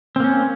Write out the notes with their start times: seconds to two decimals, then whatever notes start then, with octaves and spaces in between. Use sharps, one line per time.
0.16 C4
0.20 A#3
0.24 C#4